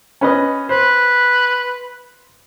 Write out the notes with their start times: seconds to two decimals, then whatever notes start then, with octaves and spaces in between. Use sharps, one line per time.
0.21 C#4 B4 D#5
0.69 B4 C5